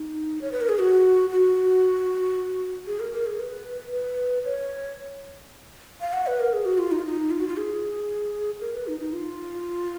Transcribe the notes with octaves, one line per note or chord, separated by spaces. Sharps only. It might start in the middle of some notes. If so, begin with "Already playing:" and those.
Already playing: D#4
C#5
B4
A#4
G#4
F#4
F#4
G#4
A#4
A#4
G#4
B4
B4
C#5
F5
F#5
B4
A#4
G#4
F#4
F4
D#4
F4
D#4
F4
F#4
F4
G#4
A#4
B4
D#4
D#4
F4